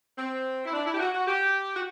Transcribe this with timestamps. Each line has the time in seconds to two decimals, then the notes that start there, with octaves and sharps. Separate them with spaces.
0.18 C4
0.65 E4
0.73 D4
0.86 E4
0.94 G4
1.00 F#4
1.14 F#4
1.28 G4
1.76 F#4